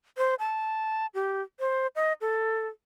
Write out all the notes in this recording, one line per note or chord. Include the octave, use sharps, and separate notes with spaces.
C5
A5
G4
C5
D#5
A4